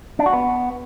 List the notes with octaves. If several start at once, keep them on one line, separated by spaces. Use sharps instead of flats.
D4
F#4
B3